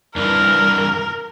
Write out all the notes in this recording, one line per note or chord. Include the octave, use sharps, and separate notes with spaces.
G2 E3 A#4